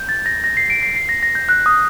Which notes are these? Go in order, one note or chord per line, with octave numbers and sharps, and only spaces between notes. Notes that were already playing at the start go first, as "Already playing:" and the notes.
Already playing: G6
A6
A#6
A#6
C7
D7
C7
C7
A#6
A#6
G6
F#6
D#6